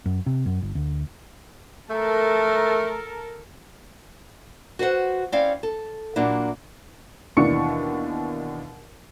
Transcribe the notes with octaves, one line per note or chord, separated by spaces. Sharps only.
F#2
C3
F#2
G1
D2
A3 A4 A#4
F#4 B4 C5 F#5
C4 C#4 E4 D5 F5
A4
A#2 F#3 A#3 D4 E4
D#2 B2 E3 D4 C#6 C#7